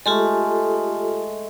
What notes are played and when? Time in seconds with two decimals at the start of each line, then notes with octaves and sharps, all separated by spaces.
0.06 G#3 A3 F4 G4 A4